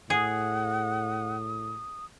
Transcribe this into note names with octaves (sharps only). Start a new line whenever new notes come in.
A2 G#4 F#5 D#6